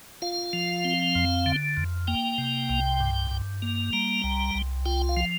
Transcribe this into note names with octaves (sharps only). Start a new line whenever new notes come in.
F4 F5
F3
C4
F2
D3
F2
A#3 G5
C3
C2
G2
G2
A#3
G3 A#5
C2
C2
F4 G5
F5
F3